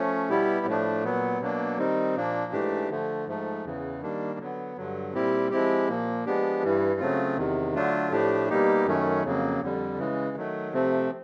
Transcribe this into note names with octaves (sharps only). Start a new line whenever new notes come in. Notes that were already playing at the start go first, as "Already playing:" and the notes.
Already playing: F3 A3 C#4
B2 G3 B3 E4 G4
A2 F3 A3 D4
A#2 F#3 B3
B2 F#3 A#3 D4
D#3 G3 C4 D#4
A#2 F3 A#3 D4
G#2 E3 A3 D4 G4
D3 F3 A3
G#2 F3 A3
E2 C#3 E3
D#3 G3 A#3 D4
D3 F#3 B3
G2 D3 F#3
A#2 G3 C4 E4 G4
F3 G#3 C4 E4 G4
A#2 F3 A#3
F3 G#3 B3 D4 G4
G2 E3 G3
C#3 F#3 A3 C4 F4
E2 C3 D#3
D3 F#3 A3 D4 F4
A2 F3 A3 D4 G4
B2 G3 A#3 D#4 G4
F#2 D#3 F#3 A3 C#4
F2 C#3 F#3 A#3
F2 D3 G3
C#3 E3 G#3
D#3 F#3 A3
C3 F3 A3 C4